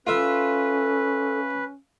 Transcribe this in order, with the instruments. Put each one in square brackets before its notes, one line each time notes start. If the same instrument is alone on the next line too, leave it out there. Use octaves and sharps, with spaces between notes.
[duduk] C#4 [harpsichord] F4 E5 [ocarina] A4 [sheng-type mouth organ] B4